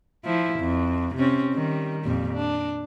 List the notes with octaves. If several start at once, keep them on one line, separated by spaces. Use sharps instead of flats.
F3 E4
F2
C3 C4 C#4
D#3 G3
F2 A#2 G3
D4